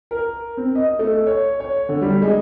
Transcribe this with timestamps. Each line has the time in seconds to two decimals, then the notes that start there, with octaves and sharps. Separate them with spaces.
0.11 A#4
0.57 C4
0.75 D#5
0.99 A3
1.27 C#5
1.60 C#5
1.89 D3
2.02 G3
2.22 G#3